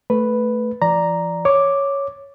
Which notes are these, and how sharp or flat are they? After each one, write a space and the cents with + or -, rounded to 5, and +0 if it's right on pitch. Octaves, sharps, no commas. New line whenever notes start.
A3 +0 B4 +0
F3 -45 D5 +0 A#5 +0
C#5 +0 D6 +0